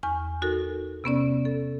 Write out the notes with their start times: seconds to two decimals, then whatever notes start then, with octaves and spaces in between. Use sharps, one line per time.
0.03 E2 G#5 C#6 F6
0.42 D#4 F#4 A4 A#4
1.04 C3 B3 C#4 D5
1.45 A4